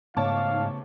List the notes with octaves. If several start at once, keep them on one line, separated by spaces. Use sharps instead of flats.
G#2 C#3 A3 B3 C#5 F5 A5 D6